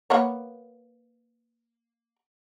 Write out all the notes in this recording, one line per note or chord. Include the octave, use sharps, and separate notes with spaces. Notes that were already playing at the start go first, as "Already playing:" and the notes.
A#3 B3 C#5